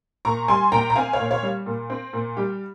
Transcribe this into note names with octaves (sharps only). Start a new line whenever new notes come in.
A#2 A#5 C#6
G3 G#5 C6
A#2 G5 A#5
A#5
C4 F5 G#5
C#5 F5
A#2
C#5 F5
G3
A#2
C4
A#2
G3 G4